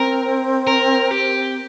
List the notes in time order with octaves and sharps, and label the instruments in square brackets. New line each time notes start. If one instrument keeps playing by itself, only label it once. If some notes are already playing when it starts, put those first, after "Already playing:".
Already playing: [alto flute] C4 [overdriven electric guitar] A#4
[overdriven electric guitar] A#4
G4